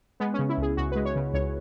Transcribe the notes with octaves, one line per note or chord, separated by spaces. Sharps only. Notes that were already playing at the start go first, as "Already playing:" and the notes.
G#3 B3
C#4
C#3
E4
C#2 G#4
C#2 F#4
G#3 B4
C#5
C#3
C#2 C#5